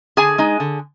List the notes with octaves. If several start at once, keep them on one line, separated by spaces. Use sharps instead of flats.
D3 G#4 G#5
G#3 D#4
D3